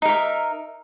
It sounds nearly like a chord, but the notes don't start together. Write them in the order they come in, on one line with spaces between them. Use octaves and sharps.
D#4 A#4 E5